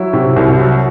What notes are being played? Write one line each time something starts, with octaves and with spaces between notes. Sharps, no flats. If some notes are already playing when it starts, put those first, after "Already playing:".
Already playing: F#3 E4
C3
C2
F#3